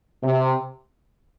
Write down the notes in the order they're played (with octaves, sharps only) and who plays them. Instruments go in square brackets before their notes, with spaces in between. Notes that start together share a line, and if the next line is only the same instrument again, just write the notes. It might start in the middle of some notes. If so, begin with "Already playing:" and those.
[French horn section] C3